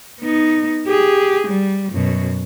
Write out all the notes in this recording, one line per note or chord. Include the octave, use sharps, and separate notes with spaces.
B3 D#4
G4 G#4
G3
F#2 B2